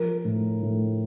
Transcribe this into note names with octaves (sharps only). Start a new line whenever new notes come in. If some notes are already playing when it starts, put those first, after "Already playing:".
Already playing: F3 A#4
A2
A2